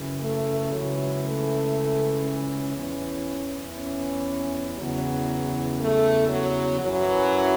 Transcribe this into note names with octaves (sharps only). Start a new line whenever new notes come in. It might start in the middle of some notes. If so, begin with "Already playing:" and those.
Already playing: F#2 C#3 E3
A3
C#2 C#3 E3 F#3
A3
C#4
E2 E3
C#4
E2 C#3 E3 F#3
A3
F#3
F#2 E3 F#3